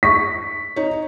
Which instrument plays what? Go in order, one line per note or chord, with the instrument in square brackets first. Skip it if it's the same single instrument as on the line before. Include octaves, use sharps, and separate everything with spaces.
[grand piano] C#6 B6
[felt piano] D#4 C#5